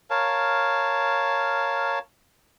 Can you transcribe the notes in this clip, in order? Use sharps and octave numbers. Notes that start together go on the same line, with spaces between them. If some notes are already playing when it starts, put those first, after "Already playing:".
A#4 C#5 F5 A5